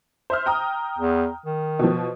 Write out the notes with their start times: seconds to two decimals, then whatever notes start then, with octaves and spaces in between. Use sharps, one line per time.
0.30 C5 E5 F6
0.46 G5 A#5 D#6
0.98 E2
1.46 D#3
1.79 B2 F3